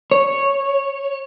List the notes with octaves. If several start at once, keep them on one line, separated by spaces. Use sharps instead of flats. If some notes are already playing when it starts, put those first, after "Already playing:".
C#5